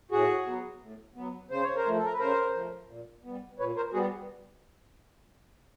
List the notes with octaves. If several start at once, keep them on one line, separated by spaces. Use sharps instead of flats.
A2 F#4 G#4
F#3 B3
A2
F#3 B3
C#3 C5
C#5
A#4 C5
F3 A3
A4
A#4
B4
C#3 A#4 C5
F3 A3
A#2
G3 B3
A#2 B4 C#5
A#4 C5
G3 B3 F#4 G#4